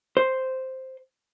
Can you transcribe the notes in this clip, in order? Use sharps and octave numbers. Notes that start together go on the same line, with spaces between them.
C5